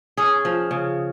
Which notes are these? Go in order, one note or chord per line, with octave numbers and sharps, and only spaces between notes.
C#4 G#4
F3
C#3